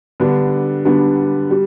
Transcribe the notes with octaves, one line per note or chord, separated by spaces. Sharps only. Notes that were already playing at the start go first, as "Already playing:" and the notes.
D3 G3 B3 D4
D3 G3 B3 D4
G3